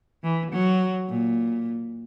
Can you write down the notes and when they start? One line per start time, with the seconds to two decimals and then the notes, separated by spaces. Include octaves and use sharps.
0.23 E3
0.51 F#3
1.08 A#2